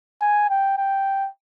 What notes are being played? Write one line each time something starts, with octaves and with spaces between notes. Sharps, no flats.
G#5
G5
G5